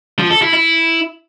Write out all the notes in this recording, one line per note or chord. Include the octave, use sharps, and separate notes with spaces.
F3
A4
E4
E4